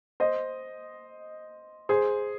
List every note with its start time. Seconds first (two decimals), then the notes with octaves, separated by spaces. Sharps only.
0.20 C5 D#5
1.89 G#4 C5